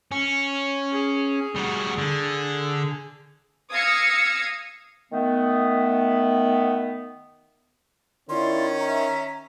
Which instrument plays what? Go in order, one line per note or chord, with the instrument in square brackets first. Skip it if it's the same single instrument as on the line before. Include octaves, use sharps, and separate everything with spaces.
[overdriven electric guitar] C#4
[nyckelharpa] G#4
[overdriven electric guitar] G3 F#4
D3
[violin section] F5 D#6 E6 G#6 A#6 C#7
[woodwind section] D#3 A3 B3
[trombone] D#3 [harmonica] C#4 [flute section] E4 F4 D5 [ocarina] C6
[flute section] E5 [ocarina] A#5